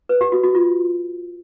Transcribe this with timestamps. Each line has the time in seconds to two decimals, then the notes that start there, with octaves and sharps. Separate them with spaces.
0.09 B4
0.21 G4
0.32 F#4
0.43 F#4
0.55 F4